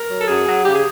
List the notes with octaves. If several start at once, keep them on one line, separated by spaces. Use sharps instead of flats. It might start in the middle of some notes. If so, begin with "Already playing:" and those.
Already playing: A#4
F#3
A4
F#2 G#4
F#3
C#3 G4
G#4